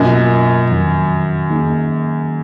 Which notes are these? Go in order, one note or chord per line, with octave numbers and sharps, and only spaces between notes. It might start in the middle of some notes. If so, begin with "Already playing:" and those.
Already playing: F#2 B2 A#3 F4 A#4 D#5
F2 D#3 F#3
D#3 A#3 D#4 G#4